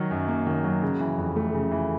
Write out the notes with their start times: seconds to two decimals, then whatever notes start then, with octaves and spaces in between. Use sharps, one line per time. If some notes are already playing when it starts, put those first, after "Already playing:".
Already playing: D#3 F#3
0.11 F#2
0.28 A#3
0.47 D#3
0.64 F#3
0.82 C#3
1.00 E3
1.18 F2
1.36 A3
1.54 C#3
1.71 E3